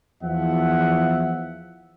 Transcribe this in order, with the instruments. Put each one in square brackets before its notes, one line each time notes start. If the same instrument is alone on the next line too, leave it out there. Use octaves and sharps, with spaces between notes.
[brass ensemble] E2 F3 E5 F#5